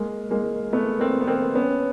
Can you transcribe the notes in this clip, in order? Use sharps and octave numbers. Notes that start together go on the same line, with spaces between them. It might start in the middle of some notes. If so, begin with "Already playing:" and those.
Already playing: G#3 A#3
G#3 A#3
A3 B3
A#3 C4
B3
A#3 C4
B3 C#4